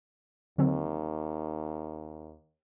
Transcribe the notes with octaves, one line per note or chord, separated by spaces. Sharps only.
D#2 D3 F#3 C4